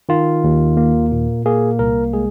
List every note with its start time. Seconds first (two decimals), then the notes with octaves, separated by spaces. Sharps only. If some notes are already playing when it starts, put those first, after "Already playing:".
0.09 D#3 F4
0.44 D#2
0.77 A#3
1.12 A#2
1.45 A#3 G#4
1.79 C2 A#4
2.13 G#3 G#4